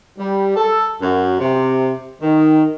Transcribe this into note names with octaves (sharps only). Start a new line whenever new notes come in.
G3
A4
F#2
C3
D#3